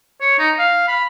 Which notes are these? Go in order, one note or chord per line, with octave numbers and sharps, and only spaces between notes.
C#5
D#4
F5
B5